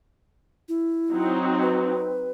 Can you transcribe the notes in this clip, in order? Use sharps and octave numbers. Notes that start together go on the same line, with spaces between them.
E4
F#3 C4 D#4
B4